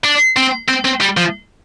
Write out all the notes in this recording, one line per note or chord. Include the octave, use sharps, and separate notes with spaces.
D4
C4
C4
C4
G3
F3